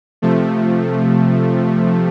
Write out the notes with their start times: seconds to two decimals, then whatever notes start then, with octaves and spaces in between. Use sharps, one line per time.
0.22 C3 F3 A3